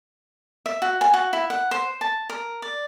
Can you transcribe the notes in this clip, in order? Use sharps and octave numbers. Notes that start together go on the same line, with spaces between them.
E5
F#4
G#5
F#4
E4
F#5
C5
A5
A#4
D5